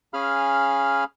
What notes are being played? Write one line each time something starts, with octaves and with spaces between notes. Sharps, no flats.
C#4 G#4 F5 B5 F6